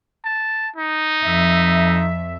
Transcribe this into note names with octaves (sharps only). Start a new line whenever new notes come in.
A5
D#4
F2 E5